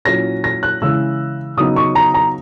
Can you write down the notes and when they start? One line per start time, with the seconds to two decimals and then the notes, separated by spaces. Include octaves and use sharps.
0.05 A#2 F#3 C#4 E4 A#6
0.44 A#6
0.63 F#6
0.82 C#3 E3 G#3 E6
1.57 C#3 F#3 B3 D#4 D#6
1.76 C#6
1.95 A#5
2.14 A#5